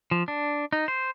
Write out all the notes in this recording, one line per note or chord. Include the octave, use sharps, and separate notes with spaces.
F3
D4
D#4
C5